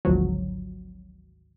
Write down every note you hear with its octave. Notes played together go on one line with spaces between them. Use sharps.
G#1 D2 F3 F#3